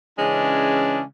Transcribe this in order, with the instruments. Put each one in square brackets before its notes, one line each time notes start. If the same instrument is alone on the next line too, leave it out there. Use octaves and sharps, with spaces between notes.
[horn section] C#3 E3 G#3 C#4 D4